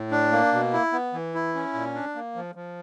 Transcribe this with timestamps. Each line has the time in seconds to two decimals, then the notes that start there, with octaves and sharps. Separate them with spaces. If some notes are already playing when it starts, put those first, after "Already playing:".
Already playing: A2
0.11 D4
0.32 A#3
0.53 B2
0.73 E4
0.92 B3
1.14 E3
1.34 E4
1.55 C#4
1.74 A#2
1.95 D4
2.15 A#3
2.35 F3
2.55 F3